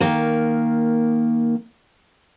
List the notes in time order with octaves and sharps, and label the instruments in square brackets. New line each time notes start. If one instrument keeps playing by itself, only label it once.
[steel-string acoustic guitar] D#3 A#3